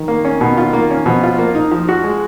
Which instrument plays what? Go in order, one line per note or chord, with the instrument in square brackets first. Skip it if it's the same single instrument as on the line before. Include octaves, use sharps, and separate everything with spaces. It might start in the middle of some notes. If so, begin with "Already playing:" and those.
Already playing: [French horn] D#3
[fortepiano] A#3
C#4
B2
F4
A#3
C#4
[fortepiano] B2 [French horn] F3
[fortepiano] F4
A#3
D#4
F3
F#4
G#3